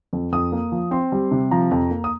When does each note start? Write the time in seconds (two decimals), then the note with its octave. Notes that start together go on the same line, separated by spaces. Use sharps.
0.13 F2
0.32 F2 D#6
0.52 A#3
0.72 F3
0.91 C4 C6
1.12 G3
1.31 C3
1.51 F3 A#5
1.71 F2
1.91 A#3
2.04 D#6